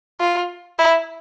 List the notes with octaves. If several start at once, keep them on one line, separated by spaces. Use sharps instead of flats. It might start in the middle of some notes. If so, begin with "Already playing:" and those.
F4
E4